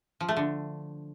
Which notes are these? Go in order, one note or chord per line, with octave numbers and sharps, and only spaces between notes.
F3
A3
D3